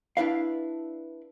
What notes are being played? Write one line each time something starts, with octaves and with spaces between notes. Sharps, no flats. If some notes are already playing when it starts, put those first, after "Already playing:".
D4 E4 B4 F5